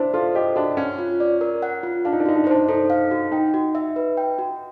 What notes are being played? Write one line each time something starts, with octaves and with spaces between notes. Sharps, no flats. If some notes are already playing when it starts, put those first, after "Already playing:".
Already playing: D4 E4 C5
F4 A4
G4 D#5
D4 F#4
C#4 F#5
F4
D5
A#4
F#5
F4
D4 F5
D#4
D4
D#4 F#4
D4
D#4
D4 C5
D#4 A4
F5
F#4
D#4 G5
F#4
E5
B4
G5
F#4